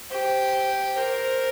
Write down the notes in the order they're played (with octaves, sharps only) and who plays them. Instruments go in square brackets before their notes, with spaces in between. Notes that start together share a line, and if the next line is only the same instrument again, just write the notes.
[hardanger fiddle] G4 [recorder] C5
[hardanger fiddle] A#4 [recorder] C5